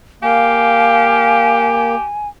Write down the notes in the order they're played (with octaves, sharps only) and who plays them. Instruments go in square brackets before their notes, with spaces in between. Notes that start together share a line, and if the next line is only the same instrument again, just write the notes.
[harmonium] A#3 [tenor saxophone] G4 [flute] F5 [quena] G#5